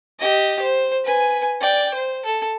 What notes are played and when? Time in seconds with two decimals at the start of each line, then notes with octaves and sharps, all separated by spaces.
0.19 G4 D#5
0.62 C5
1.04 B4 G#5
1.60 D5 G5
1.94 C5
2.25 A4